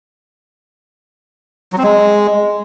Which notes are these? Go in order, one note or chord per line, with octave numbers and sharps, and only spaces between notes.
F#3
C4
G#3